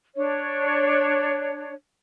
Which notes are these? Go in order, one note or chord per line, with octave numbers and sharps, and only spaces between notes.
D4 C#5